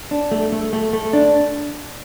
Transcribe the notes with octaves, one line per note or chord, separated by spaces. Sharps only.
D4
A3
A3
A3
A3
D4